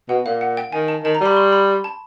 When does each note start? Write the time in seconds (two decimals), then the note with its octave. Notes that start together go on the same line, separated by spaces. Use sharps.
0.09 B2 F#5
0.26 A#2 F5
0.41 F#5
0.57 G5
0.72 D#3 G#5
0.88 A5
1.04 D#3 A5
1.15 A#5
1.21 G3 B5
1.31 C#6
1.37 C6
1.53 B5
1.84 A5